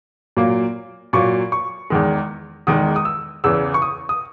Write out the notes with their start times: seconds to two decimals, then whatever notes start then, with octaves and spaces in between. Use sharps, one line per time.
0.37 A#2 F#3 A#3
1.13 A#2 F#3 A#3 C#6
1.52 C#6
1.90 E2 D#3 G#3
2.67 E2 D#3 G#3 D#6
2.96 D#6
3.05 E6
3.44 E2 C#3 E3 E6
3.74 C#6
3.82 D#6
4.09 D#6